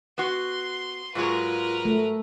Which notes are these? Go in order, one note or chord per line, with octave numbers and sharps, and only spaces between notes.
B3 F#4 C6
G#2 F#3 G#3 F4 A#4 B4
A3